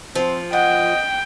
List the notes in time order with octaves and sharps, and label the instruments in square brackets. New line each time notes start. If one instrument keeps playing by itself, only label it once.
[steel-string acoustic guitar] F3 [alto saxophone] C4
[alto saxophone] D#5 [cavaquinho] F#5 [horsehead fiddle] G5